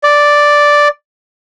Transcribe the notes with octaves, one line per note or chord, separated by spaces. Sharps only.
D5